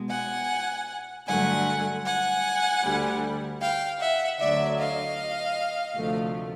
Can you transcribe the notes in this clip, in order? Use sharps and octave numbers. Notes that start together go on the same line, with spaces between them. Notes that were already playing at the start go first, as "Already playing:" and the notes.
Already playing: B2 G#3
F#5 G#5
G2 D3 F#3 A3 F#5 G#5
F#5 G#5
D2 D3 G3
F5 G5
E5 F#5
D2 D3 F#3 D5 E5
D#5 F5
D2 C3 F3 A3